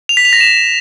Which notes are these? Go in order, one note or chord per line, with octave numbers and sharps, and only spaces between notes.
F7
B6
F7
A#6
E7